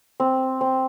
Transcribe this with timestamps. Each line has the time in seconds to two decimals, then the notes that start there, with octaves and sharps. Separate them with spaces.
0.20 C4
0.61 C4